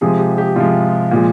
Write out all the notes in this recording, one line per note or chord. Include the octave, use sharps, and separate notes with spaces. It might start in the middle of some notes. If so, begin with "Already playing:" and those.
C3 F3 G#3 G#4
G4
G4
C3 F3 G#3 F4
A#2 F3 G#3